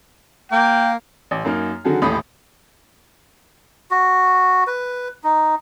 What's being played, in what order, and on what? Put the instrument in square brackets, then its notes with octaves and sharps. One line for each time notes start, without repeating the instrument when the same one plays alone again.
[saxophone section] A#3 [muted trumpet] G5
[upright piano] A1
F#2 A#3 D#4 F6
D3 D#3 F#3 F#4 G#4 A4
D#1 A1 A2 B5 D#6
[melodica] F#4
B4
D#4